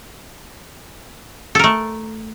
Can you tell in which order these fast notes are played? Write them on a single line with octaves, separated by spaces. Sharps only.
A4 A#4 A3